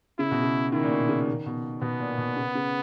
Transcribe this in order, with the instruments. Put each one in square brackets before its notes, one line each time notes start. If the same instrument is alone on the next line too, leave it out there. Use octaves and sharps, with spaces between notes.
[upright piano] C#3 [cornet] E4
[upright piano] B2
C#3
[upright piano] D#3 [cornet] E4
[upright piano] A#2
B2
C#3
D#3
B2
[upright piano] B2 [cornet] B3
[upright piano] A#2
B2
C#3
C#3